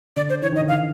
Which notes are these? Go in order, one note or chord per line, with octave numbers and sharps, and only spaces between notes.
D3 D5
C5
E3 C#5
D#3 D#5
D3
F5
D#3